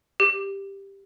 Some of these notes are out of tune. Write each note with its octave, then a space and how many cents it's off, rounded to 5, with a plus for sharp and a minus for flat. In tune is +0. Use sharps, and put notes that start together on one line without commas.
G4 +5